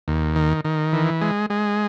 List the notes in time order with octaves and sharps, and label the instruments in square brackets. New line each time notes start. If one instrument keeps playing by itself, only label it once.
[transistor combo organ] D#2
D#3
D#3
E3
G#3
G#3